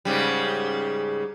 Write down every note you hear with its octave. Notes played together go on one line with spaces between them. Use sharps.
G#2 C#3 G3